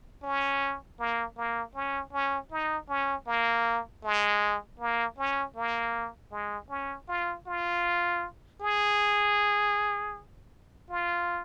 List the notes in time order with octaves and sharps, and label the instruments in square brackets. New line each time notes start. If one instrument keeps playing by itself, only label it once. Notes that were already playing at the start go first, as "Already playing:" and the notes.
[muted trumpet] C#4
A#3
A#3
C#4
C#4
D#4
C#4
A#3
G#3
A#3
C#4
A#3
G#3
C#4
F4
F4
G#4
F4